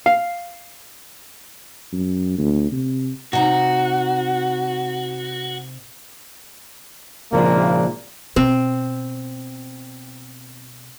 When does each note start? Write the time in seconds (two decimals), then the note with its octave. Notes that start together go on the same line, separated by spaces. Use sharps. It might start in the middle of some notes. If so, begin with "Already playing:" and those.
0.06 F5
1.92 F#2
2.38 D2
2.72 C3
3.33 C3 D#4 F#4 A#5
7.33 G#1 A#2 C#3 F3 A#3 D4
8.36 B2 C4